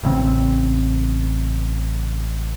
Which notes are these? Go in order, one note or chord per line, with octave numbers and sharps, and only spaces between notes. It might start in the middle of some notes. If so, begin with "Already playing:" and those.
A1 C#3 C4